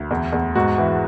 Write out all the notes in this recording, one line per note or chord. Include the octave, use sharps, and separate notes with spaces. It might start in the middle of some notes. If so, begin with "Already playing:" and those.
Already playing: D2
E2
E2
G#2 F#4
E3